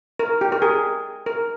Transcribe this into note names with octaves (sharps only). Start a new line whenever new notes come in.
A#4
G4
A#4
G#4
A#4